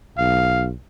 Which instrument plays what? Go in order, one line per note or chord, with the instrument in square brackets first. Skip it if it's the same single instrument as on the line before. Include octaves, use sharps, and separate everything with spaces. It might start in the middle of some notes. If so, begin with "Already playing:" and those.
[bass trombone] B1 [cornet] F5